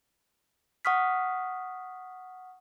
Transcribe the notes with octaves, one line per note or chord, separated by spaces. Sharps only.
F#5 C#6 D#6 F6 B6